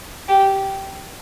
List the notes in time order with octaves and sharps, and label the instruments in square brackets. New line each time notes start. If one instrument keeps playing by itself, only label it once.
[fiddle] G4